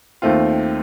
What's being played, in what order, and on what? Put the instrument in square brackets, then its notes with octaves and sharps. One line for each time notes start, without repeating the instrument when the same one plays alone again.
[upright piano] D#2 D#3 A3 C4 F4